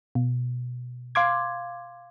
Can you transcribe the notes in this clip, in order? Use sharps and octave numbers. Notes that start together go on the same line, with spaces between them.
B2
F5 C6 D6 G#6